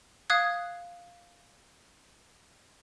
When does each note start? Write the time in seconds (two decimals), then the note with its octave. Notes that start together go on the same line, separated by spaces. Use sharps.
0.30 F5 D#6 F#6 G#6